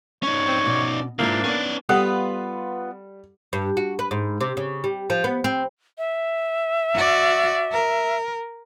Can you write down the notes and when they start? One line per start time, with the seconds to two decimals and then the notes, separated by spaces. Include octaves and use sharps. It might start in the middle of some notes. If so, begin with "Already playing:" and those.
0.23 C#4 D#4 C#5
0.48 C4
0.66 B2 D5
1.19 C#2 G#2 A#3 D4 E4 F4 A#4
1.44 B3 C#4 D5
1.89 G3 B3 F4 A4 B4 F#5 G5
3.53 G2
3.77 F#4
3.99 B4
4.11 G#2
4.41 C3
4.57 C#3
4.84 G3
5.10 F3
5.24 B3
5.44 C4
5.98 E5
6.94 F#4 D5
7.71 A#4